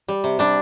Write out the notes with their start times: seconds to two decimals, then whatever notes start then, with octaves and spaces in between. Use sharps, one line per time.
0.08 G3
0.24 C3
0.39 G3 D4